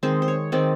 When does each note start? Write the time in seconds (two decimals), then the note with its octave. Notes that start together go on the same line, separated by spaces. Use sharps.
0.03 D#3 G#3 C4 C5
0.22 C5
0.28 C#5
0.52 D#3 G#3 C4 D5